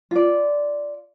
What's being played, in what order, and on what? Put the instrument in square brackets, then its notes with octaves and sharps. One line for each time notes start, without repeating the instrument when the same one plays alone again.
[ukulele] F4 D5